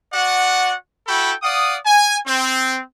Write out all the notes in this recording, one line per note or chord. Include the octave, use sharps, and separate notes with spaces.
F#4 D5 F#5
E4 F#4 A4 G5 B5
D5 F5 F#5 D#6
G#5
C4